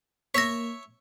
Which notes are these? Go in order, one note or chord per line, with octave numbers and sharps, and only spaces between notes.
A#3 C#5 E5 A#6 B6